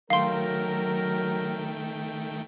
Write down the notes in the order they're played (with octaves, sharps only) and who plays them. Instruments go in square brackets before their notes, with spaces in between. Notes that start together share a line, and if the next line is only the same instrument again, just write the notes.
[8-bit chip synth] D#3 A3 G5 [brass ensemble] F#3 A#4 [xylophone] F5 C6